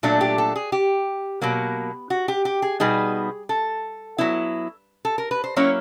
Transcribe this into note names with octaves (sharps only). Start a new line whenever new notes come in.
A#2 F#3 A3 D4
G4
A4
G#4
G4
B2 F#3 A#3
F#4
G4
G4
G#4
B2 G3 B3 D#4 G#4
A4
F#3 B3 E4
A4
A#4
B4
C5
F#3 A#3 C#4 E4 C#5